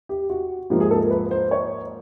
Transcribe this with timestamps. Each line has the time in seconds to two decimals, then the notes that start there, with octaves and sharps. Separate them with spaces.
0.09 G4
0.30 F#4
0.70 G#2 F3 A#3 G4
0.80 G#4
0.91 A4
1.01 A#4
1.11 B4
1.31 C5
1.51 C#5